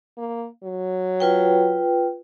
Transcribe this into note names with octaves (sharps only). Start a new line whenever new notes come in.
A#3
F#3
F4 B4 G5